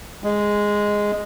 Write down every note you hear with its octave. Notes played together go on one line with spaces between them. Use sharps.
G#3